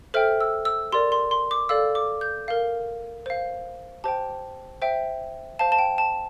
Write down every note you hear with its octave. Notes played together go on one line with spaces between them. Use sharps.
A4 C5 E5 G5 F6
E6
E6
G4 A#4 D5 C6
C6
C6
D6
A4 D5 F5 E6
D6
G6
A#4 F5
C5 F5
G4 C5 G5 A5
C5 E5 G5
C5 F5 A5
A5
G5
A5